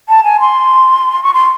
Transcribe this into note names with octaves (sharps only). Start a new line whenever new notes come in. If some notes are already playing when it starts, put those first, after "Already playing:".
A5
G#5
C6
C#6
C6